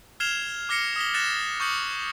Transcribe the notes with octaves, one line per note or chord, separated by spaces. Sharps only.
F6 G#6 C7 E7 F7 G7
D6 F6 A#6 C7 C#7
D#6 A#6 B6 G7
F#6 A6 A#6 C#7 E7
C#6 D#6 G6 A6 C#7 F#7